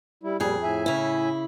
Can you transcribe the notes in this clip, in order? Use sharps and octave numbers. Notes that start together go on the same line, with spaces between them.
G3 E4
F2 A#2 G3 G#4
A2 E5 G#5
C#3 E4